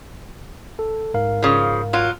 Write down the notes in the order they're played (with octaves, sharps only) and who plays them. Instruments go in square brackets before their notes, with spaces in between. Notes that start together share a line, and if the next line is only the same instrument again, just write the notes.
[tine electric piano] A4
G#2 A#4 F5
[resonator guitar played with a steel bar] C#3 F3
F#3 F4